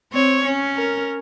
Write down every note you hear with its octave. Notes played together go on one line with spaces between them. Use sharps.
C4 C#5
C#4
A#4